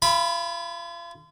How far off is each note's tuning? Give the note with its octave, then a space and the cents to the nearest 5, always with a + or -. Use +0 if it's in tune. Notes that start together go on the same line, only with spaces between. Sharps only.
F4 -40 B5 +0